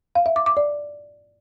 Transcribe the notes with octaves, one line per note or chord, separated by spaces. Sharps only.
F5
E5
D6
D6
D5